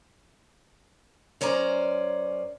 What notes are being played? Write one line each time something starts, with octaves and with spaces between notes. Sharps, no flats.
F#2 C#4 C5 D5 A#5